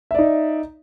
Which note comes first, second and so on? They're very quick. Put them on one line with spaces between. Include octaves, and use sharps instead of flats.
E5 D5 D#4